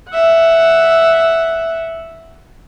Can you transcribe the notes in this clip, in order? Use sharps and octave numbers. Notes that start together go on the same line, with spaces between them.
E5 F#5